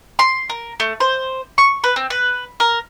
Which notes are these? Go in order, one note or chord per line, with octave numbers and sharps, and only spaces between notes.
C6
A#4
A3
C5
C#6
B4
C4
B4
A#4